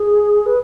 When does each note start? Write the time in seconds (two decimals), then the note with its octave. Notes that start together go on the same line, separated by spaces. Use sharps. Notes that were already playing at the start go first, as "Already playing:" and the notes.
Already playing: G#4
0.46 B4